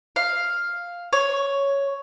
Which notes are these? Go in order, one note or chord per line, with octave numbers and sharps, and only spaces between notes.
F5
C#5